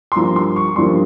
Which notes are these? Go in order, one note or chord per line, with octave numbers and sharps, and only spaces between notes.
C6
G2 F3 A#3 A#5
C6
C#6
G2 F3 A#3 C6